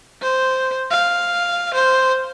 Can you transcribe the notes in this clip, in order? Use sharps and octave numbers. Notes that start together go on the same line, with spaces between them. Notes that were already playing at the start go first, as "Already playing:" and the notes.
C5
F5
C5